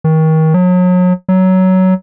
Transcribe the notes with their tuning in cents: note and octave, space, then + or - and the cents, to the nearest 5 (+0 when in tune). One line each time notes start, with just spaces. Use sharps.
D#3 +30
F#3 -35
F#3 +15